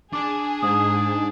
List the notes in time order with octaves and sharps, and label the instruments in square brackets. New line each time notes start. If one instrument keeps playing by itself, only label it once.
[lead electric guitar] D4 A5 [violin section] G#4 [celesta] D6
[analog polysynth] G#2 [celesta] D#6